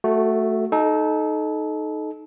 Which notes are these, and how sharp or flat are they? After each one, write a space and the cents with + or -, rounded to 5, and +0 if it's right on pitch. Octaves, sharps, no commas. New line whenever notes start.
A3 +0 F#4 +0 A4 +45
D#4 +0 A4 -30